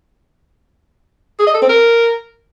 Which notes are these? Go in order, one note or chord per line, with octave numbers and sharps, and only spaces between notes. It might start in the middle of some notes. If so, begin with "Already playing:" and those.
G#4
D#5
A4
C4
A#4